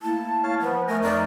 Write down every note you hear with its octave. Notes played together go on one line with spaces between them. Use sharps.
A3 A#3 E4 A5
C#5 F5 A5
F3 B3 B4
A3 A#4 D#5 G#5
F2 F3 D#4 A#4 D5 D#5